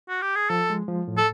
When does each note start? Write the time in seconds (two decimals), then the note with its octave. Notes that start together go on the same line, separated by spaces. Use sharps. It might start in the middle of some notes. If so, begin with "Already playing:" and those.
0.09 F#4
0.22 G4
0.35 G#4
0.50 F3 A4
0.70 G#3
0.88 F3
1.08 A2
1.17 A4